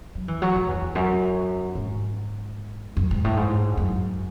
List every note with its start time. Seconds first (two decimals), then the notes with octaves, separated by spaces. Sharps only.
0.15 F#3
0.28 E3
0.42 F#3
0.56 G#2
0.68 E2
0.82 E2
0.95 F#2
1.75 G#2
2.97 F#2
3.11 G#2
3.24 A2
3.37 G#2
3.77 F#2